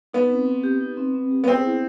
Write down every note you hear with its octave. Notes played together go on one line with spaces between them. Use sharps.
B3 D#4
C4
C4
G4
D#4
C4
C4
G4
B3
C4 G#4
E4